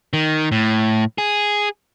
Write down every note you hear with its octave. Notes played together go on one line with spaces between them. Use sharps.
D#3
A2
G#4